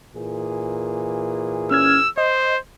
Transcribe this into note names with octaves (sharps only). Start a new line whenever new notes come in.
A#2 E3 G#4
C#4 E6 F6 G#6
C5 D#5